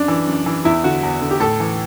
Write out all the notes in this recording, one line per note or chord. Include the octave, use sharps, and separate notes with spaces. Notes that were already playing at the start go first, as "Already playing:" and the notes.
Already playing: F#2 D4
E3
F#2
E3
E2 E4
D3 F#4
E2
D3
G4
A2 A4
E3